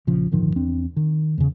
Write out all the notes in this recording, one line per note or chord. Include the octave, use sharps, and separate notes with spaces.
A#1 C#3 F3
D1 G1 D#3 F3
E2 C4 D4
D#3
E2 C#3